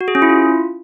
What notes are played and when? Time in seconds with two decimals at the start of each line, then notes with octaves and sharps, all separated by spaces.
0.01 F#4
0.08 G#4
0.15 C#4
0.22 E4
0.29 F4